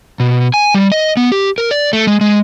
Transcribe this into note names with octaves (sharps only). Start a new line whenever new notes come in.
B2
G#5
G3
D#5
B3
G4
A#4
D5
A3
G#3
G#3